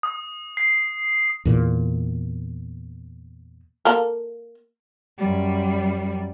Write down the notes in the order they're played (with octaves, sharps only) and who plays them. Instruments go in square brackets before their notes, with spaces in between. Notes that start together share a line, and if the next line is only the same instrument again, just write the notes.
[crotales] D#6
C7
[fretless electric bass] E2 A#2
[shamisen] A#3 A4 A#4
[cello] F#2 G3